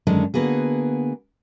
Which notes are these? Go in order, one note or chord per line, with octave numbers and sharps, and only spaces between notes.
F#2 D3 D#3 G#3 D4
D3 A#3 B3 F#4 G#4